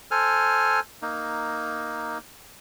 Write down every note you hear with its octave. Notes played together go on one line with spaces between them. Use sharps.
A4 C5 G#5 F6
A#3 D#4